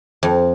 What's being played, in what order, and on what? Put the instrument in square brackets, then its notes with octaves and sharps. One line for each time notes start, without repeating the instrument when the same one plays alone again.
[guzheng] F2